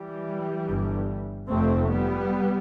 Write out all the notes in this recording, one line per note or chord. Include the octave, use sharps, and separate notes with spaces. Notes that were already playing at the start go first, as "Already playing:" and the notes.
Already playing: E3 G3
G1 G2
F1 F2 C3 A3 C4
G3 B3